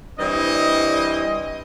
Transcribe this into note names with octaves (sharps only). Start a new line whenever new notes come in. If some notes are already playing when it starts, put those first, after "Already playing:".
E3 G3 C4 D4 D#5